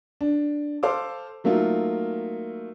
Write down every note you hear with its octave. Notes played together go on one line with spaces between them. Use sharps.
D4
A4 C5 F5 C6 D6
F#3 A3 A#3 D#4 F4